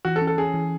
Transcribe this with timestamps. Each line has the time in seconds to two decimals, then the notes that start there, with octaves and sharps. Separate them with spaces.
0.05 E3 F#4
0.16 A4
0.22 C#4
0.27 A4
0.38 C#4 G#4
0.54 E3